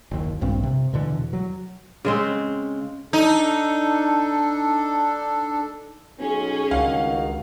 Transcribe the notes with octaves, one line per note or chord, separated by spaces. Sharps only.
F#1 D#2
A#1 G2 C4
C3
E2 B2 D3 E3
F#3
C#3 G#3 C4
D4 D#4 A4
B1 C#4 G#4
C#2 G2 D#3 F#4 F5